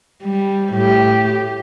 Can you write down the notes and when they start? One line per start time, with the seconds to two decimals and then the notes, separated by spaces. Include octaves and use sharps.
0.23 G3
0.73 A2 G4